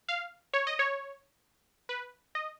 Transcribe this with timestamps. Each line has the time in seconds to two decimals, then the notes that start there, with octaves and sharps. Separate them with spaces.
0.09 F5
0.54 C#5
0.67 D#5
0.79 C#5
1.89 B4
2.35 D#5